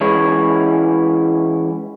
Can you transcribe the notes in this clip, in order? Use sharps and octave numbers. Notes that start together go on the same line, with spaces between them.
E3 G#3 C#4 E4 C#5